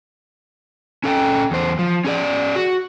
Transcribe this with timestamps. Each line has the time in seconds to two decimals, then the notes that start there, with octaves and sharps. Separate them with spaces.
1.04 C#4 A4 F#5 G5
1.51 E2 C5
1.79 F3
2.04 C#4 G#4 D5
2.56 F#4